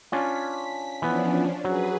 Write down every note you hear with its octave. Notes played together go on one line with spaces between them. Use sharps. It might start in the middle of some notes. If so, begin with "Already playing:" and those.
C#4 D4 F4 B6
E3 F3 B3 C#4 D4
F#3 G#4 B4